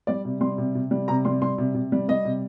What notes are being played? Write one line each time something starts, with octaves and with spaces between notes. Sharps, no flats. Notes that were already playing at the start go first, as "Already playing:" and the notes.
G3 D5
C3
G3 C6
C3
C3
G3
C3 A#5
G3 C6
G3 C6
C3
C3
G3
G3 D#5
C3